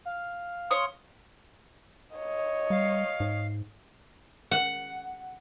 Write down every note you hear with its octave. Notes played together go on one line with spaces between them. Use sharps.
F5
C#5 C6 D#6
C#5 D#5
G3 F5
G#2
F#5